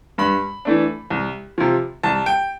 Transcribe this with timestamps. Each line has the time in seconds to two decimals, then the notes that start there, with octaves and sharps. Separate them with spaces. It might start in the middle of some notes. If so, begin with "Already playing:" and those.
0.18 G2 B5
0.65 E3 A3 D4
1.10 C2
1.58 C3 F3
2.03 C2 A5
2.26 G5